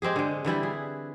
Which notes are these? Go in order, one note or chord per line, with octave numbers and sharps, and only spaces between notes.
G#3 C4 G4 G#4
D3 G#3
D3 E3 G3 E4
G#4